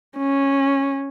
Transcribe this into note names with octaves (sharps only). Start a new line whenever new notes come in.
C#4